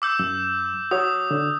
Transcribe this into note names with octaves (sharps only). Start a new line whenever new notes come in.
D6 E6 G6
F#2 E6
F#4 C#5 D#6
D3